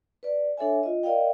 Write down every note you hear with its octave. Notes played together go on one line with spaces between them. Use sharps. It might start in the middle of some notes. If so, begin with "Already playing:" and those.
B4 D5
D4 A4 C#5 E5 G#5
F4 D#5
A#4 D5 D#5 F5 G5